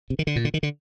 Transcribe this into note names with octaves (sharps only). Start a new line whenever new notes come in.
C3
D#3
D3
A#2
D3
D#3
D3